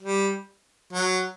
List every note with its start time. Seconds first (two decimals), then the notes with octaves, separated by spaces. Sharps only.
0.01 G3
0.93 F#3